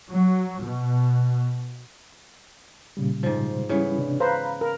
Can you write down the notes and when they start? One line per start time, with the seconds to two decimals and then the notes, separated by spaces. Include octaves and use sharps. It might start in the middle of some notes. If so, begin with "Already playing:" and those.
0.12 F#3
0.61 B2
2.97 A#2 C#3 G3
3.23 G#2 F3
3.69 C#3 E3 G3 B3 C#4 E4
3.99 C3 D4
4.20 B4 C5 F5 A#5 B5
4.61 A#4